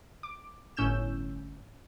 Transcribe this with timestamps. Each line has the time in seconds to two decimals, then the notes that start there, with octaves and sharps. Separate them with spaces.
0.23 D6
0.77 G1 A2 C#4 E6 G6 E7